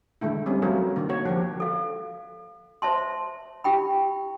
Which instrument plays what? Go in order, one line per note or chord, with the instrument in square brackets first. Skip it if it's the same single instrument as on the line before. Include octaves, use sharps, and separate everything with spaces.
[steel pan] D3 G#3 A3 E4
G3 C4 C#4
F#3 A3 F4 A#4
D3 D#3 A#3
F#4 C#5
F3 G4
[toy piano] A4 F5
C5 E5 A5 C6
E4 G4 G5 B5